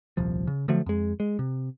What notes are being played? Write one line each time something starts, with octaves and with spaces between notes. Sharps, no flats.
D#1 C2 F3
C#3
D3 F3 F#3 A3
F2 G#3
G#3
C3